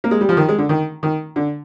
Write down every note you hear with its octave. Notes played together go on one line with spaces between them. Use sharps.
A#3
G#3
G3
F3
D#3
G#3
D3
D#3
D#3
D3